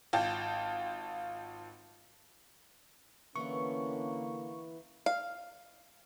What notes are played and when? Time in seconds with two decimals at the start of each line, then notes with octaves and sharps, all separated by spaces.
0.13 G#1 F4 G5 A5
3.35 D3 E3 A#3 B3 C#4 C#6
5.06 F5